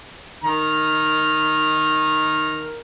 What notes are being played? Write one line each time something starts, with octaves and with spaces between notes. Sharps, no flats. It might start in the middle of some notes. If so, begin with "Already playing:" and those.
D#3 A#4 A#5